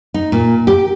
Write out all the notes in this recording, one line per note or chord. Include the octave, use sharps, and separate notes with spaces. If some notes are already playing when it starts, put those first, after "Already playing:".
D#4
A#2
G4